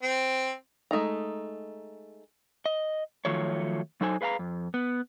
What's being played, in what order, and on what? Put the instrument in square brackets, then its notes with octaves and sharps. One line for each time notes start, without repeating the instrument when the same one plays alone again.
[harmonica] C4
[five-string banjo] G#3 A3 D#4 A#5
[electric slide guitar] D#5
D#3 F3 F#3 A3 C#5
F#3 D#4 A4 C5 G#5
G#4 B4 F5 G5 A#5
F2
B3